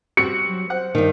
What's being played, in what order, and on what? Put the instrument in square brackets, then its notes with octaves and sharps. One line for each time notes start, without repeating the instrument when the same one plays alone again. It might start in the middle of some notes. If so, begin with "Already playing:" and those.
[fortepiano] G3 C4 F#4 [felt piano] C#7
[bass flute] F#3
[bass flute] C5 [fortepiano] F#5
[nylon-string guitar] G2 D#3